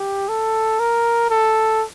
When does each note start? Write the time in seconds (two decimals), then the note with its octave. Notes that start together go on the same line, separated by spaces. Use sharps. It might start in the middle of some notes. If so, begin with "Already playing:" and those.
Already playing: G4
0.29 A4
0.80 A#4
1.30 A4